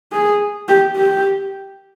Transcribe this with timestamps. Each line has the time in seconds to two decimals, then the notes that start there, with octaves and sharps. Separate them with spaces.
0.12 G#4
0.69 G4
0.97 G4